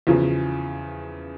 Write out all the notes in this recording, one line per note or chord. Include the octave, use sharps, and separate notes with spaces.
E2 C#3 F3